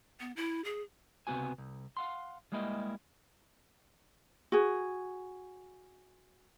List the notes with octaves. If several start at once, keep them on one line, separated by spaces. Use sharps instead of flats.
B3
E4
G#4
C#2 C3 A#3 B3 F#4 G#5
C2
F5 F#5 C6
G3 G#3 A#3 E4 G4 D#5
F#4 G#4